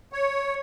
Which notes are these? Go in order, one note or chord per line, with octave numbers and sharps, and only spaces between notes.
C#5